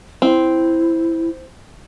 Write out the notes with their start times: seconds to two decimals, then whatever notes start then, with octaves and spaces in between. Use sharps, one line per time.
0.22 C4 E4